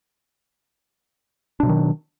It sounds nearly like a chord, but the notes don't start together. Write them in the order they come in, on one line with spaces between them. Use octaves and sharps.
D4 B2 F#3 D#3